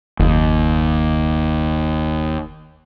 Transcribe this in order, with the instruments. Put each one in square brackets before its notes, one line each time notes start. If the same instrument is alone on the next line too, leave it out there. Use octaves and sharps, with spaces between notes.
[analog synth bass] F#1 [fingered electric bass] D#2